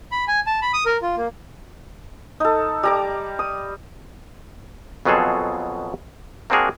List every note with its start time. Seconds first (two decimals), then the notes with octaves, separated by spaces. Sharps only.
0.12 B5
0.28 G#5
0.47 A5
0.62 B5
0.73 D#6
0.86 A#4
1.02 F4
1.17 A#3
2.40 D#4 A4
2.83 G3 A#5 D6
3.39 D#6
5.05 F2 B2 F#3 F4 G#4 A4
6.50 A#3 C4 D4 F#4 G#4 A#4